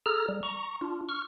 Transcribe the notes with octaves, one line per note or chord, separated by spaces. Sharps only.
G#4 A4 A#5 F6
G3
A#5 C#6
D4 F4
C#6 F6